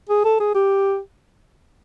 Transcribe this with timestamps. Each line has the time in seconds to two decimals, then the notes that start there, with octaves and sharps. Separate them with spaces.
0.09 G#4
0.25 A4
0.40 G#4
0.55 G4